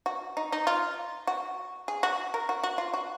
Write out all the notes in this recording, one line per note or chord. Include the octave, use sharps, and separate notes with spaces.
F#4
D#4
D#4
F4
F#4
G#4
F#4
A#4
F#4
F#4
F4
F#4